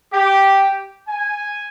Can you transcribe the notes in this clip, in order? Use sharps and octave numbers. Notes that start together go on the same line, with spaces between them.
G4
G#5